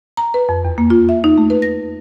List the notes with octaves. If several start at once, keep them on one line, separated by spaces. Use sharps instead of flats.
A#5
B4
F2
E2
A#3
F4
E5
D#4
A3
B4
A#6